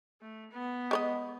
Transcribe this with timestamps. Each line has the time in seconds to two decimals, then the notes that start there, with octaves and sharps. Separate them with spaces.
0.21 A3
0.51 B3
0.91 G#3 C#5 D#5